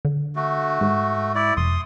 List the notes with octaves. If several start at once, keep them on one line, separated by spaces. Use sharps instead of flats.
D3
A3 F#4
G#2
E4 D5
F1 C6 D#6